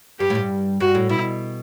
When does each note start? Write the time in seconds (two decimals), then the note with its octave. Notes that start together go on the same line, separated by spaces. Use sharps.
0.19 G2 G4
0.30 A2
0.35 G2
0.80 G2 F#4
0.95 A2
1.09 B2 E4